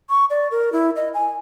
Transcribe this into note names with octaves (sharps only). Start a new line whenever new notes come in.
C#6
D5
A#4
E4
D#5
G#5